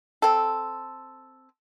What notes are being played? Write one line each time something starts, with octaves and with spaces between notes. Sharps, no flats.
C4 A4